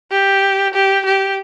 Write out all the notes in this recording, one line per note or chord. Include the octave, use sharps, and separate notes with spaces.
G4
G4
G4